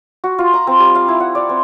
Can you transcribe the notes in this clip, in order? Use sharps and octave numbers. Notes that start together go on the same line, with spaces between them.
F#4
F4
A#5
C4
G3
F5
E4
F#5
D5
C4